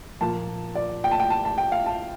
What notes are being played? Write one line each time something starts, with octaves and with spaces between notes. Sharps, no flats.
A#2 F3 A#3 F4 A5
D5
G5
A5
G5
A5
A5
G5
F5
A5